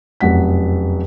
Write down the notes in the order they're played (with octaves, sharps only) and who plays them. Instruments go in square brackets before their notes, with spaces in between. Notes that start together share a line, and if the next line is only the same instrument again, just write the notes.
[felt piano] F1 F#2 F#5 B6